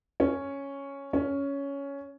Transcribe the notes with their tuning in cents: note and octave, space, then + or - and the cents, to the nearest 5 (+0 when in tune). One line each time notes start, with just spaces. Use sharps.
C#4 +0
C#4 +10